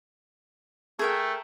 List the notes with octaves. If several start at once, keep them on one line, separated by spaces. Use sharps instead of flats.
A3 G#4 A#4 G5